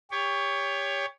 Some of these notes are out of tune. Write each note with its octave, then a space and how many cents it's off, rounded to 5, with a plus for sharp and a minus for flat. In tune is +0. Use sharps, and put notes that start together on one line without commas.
G4 +30 C#5 +15